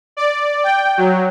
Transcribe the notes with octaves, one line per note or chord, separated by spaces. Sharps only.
D5
G5
F#3